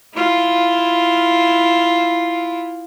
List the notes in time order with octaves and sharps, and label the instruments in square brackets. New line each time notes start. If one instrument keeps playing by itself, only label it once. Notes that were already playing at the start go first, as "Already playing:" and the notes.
[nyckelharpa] E4 F4